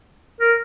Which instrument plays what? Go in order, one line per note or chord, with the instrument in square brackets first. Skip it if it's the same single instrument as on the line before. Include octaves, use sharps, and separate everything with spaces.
[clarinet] A#4